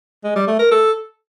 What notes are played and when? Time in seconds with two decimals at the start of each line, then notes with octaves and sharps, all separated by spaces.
0.24 G#3
0.36 G3
0.48 A3
0.59 A#4
0.71 A4